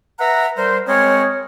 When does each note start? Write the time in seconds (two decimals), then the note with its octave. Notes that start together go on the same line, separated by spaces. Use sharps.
0.19 B4 E5 F#5 A#5
0.57 G3 A#4 C5
0.87 G#3 C4 G#4 A#4 C#5